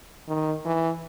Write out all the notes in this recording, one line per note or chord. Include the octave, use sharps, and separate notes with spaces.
D#3
E3